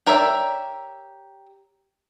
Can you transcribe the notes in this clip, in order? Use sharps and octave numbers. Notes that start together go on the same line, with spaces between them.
G4 A#4 C#5 D5 E5